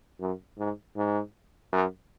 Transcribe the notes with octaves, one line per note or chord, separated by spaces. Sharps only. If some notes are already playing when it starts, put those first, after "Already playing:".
F#2
G#2
G#2
F#2